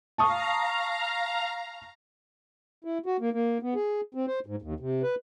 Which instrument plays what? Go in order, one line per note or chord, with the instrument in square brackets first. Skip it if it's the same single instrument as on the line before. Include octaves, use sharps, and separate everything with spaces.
[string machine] F5 A#5 [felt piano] A5 C#6 D#6
[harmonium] E4
F#4
A#3
A#3
B3
G#4
C4
C5
G#2
D#2
C3
B4